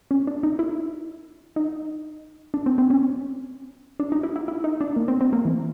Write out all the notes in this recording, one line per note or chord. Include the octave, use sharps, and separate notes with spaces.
C#4
D4
D#4
E4
D#4
D4
C4
C4
C#4
D4
D#4
E4
E4
E4
D#4
D4
A#3
C4
C4
A#3
E3